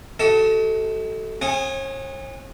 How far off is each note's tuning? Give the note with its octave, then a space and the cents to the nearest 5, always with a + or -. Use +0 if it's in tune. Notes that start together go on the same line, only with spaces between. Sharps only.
F#4 +40 A4 +0 D#5 +40
C#4 -45 G#4 +0 F#5 -15